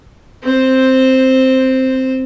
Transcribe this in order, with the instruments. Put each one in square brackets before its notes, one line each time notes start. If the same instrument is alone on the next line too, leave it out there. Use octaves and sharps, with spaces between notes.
[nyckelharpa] C4 C5